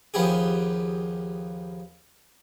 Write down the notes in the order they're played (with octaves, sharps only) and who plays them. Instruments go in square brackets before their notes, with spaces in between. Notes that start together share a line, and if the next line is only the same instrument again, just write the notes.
[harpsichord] D#2 F3 B3 G4 G#4